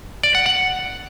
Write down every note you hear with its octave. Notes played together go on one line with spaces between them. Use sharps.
D5
F#5
F#5